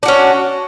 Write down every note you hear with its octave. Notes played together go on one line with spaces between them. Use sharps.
C#4 D4 F#4